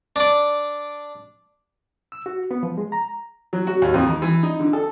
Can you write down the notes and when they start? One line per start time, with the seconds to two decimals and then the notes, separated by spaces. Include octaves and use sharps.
0.16 D4 D5
2.12 E6
2.26 F#4
2.51 B3
2.63 F3
2.77 G#3
2.92 A#5
3.53 F#3
3.67 F#4
3.82 D#2
3.94 F2
4.07 D#3
4.22 E3
4.43 D#4
4.60 D3
4.73 A4